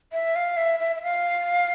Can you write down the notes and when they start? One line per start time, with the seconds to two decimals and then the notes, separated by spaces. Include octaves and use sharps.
0.13 E5
0.36 F5
0.57 E5
0.80 E5
0.96 E5
1.03 F5